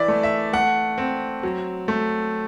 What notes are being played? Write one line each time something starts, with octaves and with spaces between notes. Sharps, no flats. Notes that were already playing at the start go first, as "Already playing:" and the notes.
Already playing: E3 D5 E5
A3
E5
A3 F#5
C4
F#3
A3